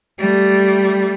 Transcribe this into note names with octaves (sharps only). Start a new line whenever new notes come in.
G3 A3